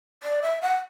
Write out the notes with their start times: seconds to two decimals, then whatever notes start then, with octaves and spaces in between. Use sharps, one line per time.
0.23 D5
0.42 E5
0.62 F#5